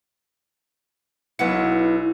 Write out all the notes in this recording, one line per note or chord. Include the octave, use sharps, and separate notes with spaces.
B1 E4 B4 F#5 C#7